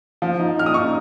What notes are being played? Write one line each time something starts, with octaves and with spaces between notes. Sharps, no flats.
F3
D#4
D#4 F6
D#6
D#4 C#6